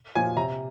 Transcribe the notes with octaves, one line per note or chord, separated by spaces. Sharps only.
A#2 F3 G#5
C3 A#5